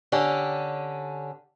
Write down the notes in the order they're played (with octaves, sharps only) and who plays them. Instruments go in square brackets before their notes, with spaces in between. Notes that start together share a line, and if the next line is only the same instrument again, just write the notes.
[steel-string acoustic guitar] D3 C#4 G4